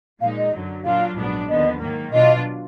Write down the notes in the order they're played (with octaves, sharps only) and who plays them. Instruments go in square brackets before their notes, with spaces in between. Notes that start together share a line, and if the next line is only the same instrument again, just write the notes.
[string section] A#2 F3 G#3 D#4 [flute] F5
[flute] D#5
[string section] F#2 D3 F#3
[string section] A#2 F#3 D4 F4 [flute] F5
[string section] A#1 G#2 F#3 B3 D4
[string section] D#2 D3 F3 B3 [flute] D#5
[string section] G#2 D#3 F#3 A#3
[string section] B2 F#3 D4 F4 [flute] D#5